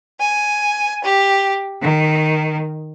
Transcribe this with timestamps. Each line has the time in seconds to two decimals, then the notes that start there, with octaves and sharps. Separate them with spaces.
0.21 G#5
1.04 G4
1.83 D#3